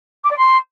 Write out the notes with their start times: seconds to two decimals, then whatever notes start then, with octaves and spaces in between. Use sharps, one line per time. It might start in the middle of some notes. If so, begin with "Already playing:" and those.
0.24 D6
0.30 D5
0.37 C6